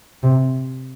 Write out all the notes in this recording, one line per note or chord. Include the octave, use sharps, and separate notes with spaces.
C3